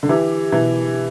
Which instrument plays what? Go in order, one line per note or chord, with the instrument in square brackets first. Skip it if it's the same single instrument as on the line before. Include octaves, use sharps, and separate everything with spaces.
[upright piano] D3
[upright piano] E3 [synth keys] G4
[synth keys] B2 [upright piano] E3